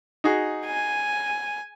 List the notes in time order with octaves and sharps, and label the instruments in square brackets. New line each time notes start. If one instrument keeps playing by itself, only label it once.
[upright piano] D#4 F#4 G#4
[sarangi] G#5